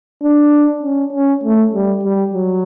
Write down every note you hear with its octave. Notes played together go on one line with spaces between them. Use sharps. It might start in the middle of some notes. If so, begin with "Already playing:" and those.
D4
C#4
C#4
A3
G3
G3
F#3